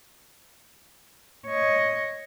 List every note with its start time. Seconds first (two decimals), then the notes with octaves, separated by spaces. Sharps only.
1.47 C#5 D#5